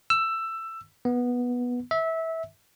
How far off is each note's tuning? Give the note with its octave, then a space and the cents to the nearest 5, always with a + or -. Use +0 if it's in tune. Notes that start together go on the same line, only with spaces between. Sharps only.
E6 +15
B3 -10
E5 -20